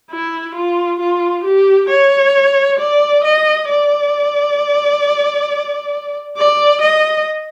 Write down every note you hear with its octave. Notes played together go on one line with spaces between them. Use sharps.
E4
F4
F4
G4
C#5
D5
D#5
D5
D5
D#5